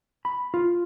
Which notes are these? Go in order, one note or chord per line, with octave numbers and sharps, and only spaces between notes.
B5
F4